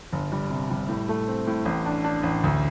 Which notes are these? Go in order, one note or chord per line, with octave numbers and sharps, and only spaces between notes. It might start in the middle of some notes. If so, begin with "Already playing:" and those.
G1
G3
C3
G3
A2
A3
C4
A2
A1
D4
D4
A1
D2